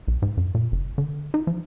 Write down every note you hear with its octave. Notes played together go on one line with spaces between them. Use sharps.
B1
G#2
F#2
A#2
F#1
D3
D#4
F3